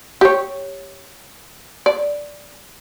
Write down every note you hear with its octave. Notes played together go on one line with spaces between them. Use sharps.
G4 C#5
D5